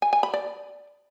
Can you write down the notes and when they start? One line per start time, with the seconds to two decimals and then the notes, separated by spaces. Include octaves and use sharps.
0.02 G#5
0.13 G#5
0.23 B5
0.34 D5